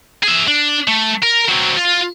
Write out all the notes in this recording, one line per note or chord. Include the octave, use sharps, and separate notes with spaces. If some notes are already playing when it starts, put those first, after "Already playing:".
G#4 E5
D4
A3
A#4
F#3 C4
F4